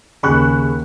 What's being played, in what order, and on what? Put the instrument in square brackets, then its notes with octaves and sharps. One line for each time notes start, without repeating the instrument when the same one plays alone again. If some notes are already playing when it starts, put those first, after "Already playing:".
[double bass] D#2 [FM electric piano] C#3 G#4 [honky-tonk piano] B5 C#6 F#6